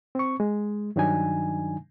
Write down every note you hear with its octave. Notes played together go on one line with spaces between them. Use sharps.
C4 C#6
G#3
G2 D#3 F#3 D4 D#4 G#5